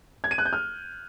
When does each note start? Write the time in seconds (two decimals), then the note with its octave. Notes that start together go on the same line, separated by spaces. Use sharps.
0.24 G#6
0.31 D#7
0.38 F#6
0.45 G6
0.53 F6